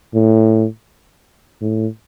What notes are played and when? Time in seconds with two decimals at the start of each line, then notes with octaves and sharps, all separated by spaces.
0.14 A2
1.61 A2